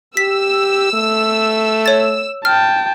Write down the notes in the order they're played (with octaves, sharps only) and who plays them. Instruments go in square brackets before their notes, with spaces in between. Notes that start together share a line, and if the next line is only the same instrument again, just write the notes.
[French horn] G4 [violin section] E6 [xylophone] B6
[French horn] A3
[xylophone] C#5 A6
[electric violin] G5 A5 [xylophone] F6